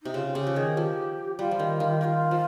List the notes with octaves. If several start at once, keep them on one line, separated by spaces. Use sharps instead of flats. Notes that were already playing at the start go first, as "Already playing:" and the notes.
C3 D#4
C#3 F4
C#3 G4
F3
D#3 G#4
F3 G4
G3 F4
F3
D#3
D#3
D#3 F4 G4
F3